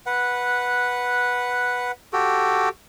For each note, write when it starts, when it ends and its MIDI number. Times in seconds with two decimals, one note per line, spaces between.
0.06 1.91 71
0.06 1.91 78
2.13 2.69 66
2.13 2.69 67
2.13 2.69 69